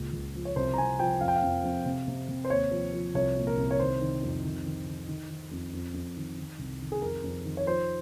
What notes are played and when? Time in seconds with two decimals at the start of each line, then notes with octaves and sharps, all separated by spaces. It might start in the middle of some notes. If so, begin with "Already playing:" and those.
Already playing: C#2 A#2
0.13 C#2
0.35 F3
0.45 C#5
0.56 C2 C5
0.74 A#5
0.78 C2 G#5
0.99 F3 G5
1.20 F2 F5
1.28 G5
1.36 F5
1.42 F2
1.63 F2
1.86 C3
2.08 C3
2.29 C3
2.45 C5
2.50 D#2 C#5
2.71 F3
2.93 F3
3.15 C2 C#5
3.37 A#2
3.47 A#4
3.57 C2
3.71 C#5
3.79 D#3 C5
4.01 D#3
4.23 F2
4.44 D#3
4.66 D#3
4.86 D#3
5.08 D#3
5.30 D#3
5.51 F2
5.73 F2
5.94 F2
6.16 D#3
6.38 D#3
6.59 C2
6.81 D#3
6.92 G#4
7.02 F2 A#4
7.24 F2
7.45 D#3
7.57 C#5
7.66 F3 C5